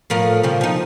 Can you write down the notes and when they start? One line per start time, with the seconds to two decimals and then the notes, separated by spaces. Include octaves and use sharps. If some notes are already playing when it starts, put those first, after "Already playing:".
0.10 A2 F3 A#4
0.43 C#3 F3 G3
0.61 F3 D#4